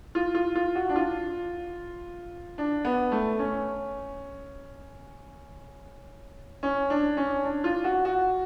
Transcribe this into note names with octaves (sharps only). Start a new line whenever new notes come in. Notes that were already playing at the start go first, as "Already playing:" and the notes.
F4
F4
F4
F#4
D4
F4
D4
B3
A3
C#4
C#4
D4
C#4
D4
F4
F#4
F#4